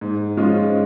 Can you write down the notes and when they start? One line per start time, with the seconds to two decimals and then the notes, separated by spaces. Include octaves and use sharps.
0.01 G#2
0.37 F3 G#3 C#4 F4